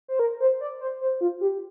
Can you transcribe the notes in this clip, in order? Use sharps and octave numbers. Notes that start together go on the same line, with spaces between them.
C5
A#4
C5
D5
C5
C5
F4
G4